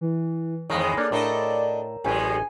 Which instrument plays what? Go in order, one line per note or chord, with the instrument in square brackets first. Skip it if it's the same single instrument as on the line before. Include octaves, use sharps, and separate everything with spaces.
[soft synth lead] E3
[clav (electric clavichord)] F2 D#3 [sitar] G#2 E3 G#3 [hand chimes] C#5 A#6 [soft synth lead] D#6
[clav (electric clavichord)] A#3 A4 [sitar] D4 [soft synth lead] D5
[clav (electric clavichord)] A2 [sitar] D4 A4 D#5 [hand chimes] A#4 C#5 A#5
[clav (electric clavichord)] A1 G4 [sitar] F#2 G#3 [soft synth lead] G#5